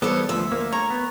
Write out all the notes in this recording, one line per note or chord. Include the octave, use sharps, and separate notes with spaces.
E3 G3 B3 A4 C5 C#5
D2 F3 E5
A#3
C#5 A#5
B3